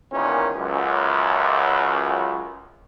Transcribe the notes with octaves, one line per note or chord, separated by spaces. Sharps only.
E2 A#2 D#3 C#4
C#2 F#2